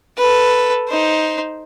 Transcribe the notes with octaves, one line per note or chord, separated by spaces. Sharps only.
A4 B4
D#4 C5